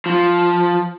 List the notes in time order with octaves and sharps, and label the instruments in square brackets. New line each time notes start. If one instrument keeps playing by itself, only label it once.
[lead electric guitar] F3